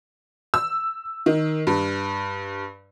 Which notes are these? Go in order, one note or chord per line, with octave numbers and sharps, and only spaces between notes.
E6
D#3
G2